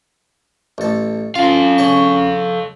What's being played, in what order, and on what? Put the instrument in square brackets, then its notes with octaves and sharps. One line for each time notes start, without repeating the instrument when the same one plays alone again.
[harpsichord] A1 A4
[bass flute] C#4 [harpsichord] F4 [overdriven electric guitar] A4 F5
[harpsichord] C#3 C#5 C#6